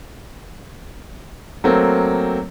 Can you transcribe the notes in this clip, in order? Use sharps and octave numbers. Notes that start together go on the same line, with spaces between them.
F#3 A3 A#3 C4